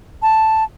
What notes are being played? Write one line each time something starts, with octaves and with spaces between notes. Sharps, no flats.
A5